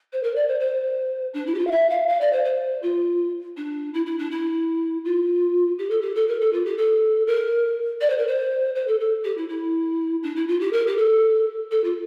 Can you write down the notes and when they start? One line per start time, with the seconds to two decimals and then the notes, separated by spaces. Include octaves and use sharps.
0.13 C5
0.23 A#4
0.36 D5
0.48 C5
0.60 C5
1.34 D4
1.47 E4
1.54 G4
1.59 F4
1.67 F5
1.71 E5
1.90 F5
2.08 F5
2.21 D5
2.33 C5
2.45 C5
2.83 F4
3.57 D4
3.94 E4
4.06 E4
4.19 D4
4.31 E4
5.05 F4
5.79 G4
5.90 A4
6.02 G4
6.15 A4
6.28 A#4
6.41 A4
6.53 F4
6.65 G4
6.78 A4
7.27 A#4
8.01 D5
8.10 C5
8.18 A#4
8.27 C5
8.75 C5
8.88 A4
9.00 A4
9.24 G4
9.37 E4
9.49 E4
10.23 D4
10.36 E4
10.48 F4
10.60 G4
10.73 A#4
10.87 G4
10.98 A4
11.71 A4
11.84 F4